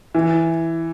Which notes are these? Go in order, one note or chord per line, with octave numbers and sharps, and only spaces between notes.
E3